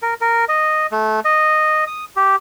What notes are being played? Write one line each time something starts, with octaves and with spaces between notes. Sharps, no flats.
A#4
A#4
D#5
A3
D#5
D#6
G4